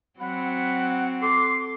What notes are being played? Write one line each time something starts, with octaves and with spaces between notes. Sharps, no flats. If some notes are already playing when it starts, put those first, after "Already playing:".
F#3 C4 F#5 B5
A4 C6 D6